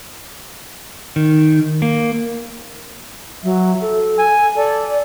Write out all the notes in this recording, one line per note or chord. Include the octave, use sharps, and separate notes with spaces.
D#3
A#3
F#3 E5
A4
G#5
A4 D5